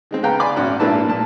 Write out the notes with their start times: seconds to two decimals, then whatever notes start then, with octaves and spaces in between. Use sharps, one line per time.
0.11 D#3 G#3 C4
0.23 C#3 B3 F5 G5 A#5
0.40 D5 G#5 B5 C6 D6
0.56 G#1 C#4 F#4 D5
0.80 G#1 A#3 D4 E4 B4 A5
1.08 A#2 A5